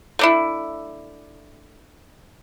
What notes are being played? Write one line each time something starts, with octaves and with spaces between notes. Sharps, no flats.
A3 D4 E4